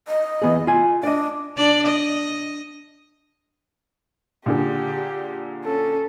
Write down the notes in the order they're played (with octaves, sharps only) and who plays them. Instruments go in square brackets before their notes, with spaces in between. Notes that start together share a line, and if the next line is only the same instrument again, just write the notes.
[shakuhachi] D#5
[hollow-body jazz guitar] E3 B3 G#4
F4 G#5
[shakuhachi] D4 [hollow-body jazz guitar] D5 D#5
[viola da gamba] D4 D5
D#5
[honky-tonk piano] A#2 D3 G#4 [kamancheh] G4
[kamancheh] C#4 A4